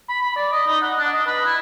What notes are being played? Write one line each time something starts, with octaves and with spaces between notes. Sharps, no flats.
B5
B5
D5
D#5
D#4
F#5
D4
D#5
B4
E4